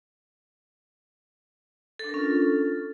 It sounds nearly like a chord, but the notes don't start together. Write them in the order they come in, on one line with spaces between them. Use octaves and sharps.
A4 D4 A#4 C#4 F4